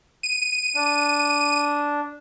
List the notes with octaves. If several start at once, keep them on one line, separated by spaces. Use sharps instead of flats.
D#7
D4